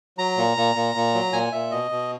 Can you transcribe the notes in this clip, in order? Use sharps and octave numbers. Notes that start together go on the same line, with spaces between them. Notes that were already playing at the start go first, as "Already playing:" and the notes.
F#3 A#5
A#2
A#2
A#2
A#2
F#3
A#2 G#5
A#2 E5
B2 D#5
B2